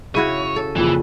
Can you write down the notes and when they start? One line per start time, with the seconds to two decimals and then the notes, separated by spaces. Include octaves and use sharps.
0.15 C#3 E4 F#4 C#5 D#7
0.56 A4
0.76 F2 A#2 C#3 E3